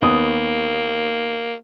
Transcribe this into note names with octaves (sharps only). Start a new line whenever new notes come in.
D#2 A#3 B3 D#6